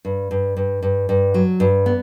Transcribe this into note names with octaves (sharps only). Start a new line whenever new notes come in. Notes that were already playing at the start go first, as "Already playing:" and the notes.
G2
G2
G2
G2
G2
F#3
G2
B3